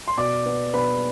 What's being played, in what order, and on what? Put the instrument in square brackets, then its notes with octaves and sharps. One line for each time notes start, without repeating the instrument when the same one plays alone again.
[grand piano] C6
B2 D5 D6
B3
B2 B4 B5